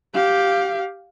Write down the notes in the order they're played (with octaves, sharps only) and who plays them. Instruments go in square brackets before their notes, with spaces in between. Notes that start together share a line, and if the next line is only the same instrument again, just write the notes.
[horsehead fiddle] G4 F5